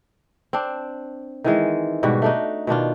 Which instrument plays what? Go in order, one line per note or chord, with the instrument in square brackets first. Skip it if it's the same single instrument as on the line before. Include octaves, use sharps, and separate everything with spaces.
[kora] C4 D4
D#3 E3 G#3
G#2 B2 G3 F#4
A3 D4 D#4
B2 D#3 D4 F4